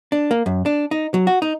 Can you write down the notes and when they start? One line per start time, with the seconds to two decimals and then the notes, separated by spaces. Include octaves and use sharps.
0.12 D4
0.31 A#3
0.46 F#2
0.66 D4
0.91 D#4
1.14 F#3
1.27 F#4
1.42 D#4